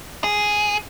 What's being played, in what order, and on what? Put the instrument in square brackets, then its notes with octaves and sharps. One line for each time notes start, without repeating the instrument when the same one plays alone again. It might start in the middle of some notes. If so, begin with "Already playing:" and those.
[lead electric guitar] G#4